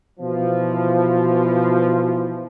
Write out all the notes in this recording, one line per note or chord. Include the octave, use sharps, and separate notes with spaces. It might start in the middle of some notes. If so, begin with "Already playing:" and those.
B2 E3 F3